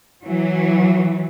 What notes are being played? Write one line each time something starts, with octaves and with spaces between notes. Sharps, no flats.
E3 F#3